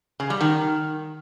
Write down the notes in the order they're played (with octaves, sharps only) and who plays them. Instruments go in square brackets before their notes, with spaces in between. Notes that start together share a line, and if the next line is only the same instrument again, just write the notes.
[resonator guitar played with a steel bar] C#3
G3
D#3